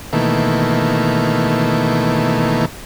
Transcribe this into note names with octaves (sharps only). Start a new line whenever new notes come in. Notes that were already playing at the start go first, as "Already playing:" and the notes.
B2 D#3 E3 A3 A#3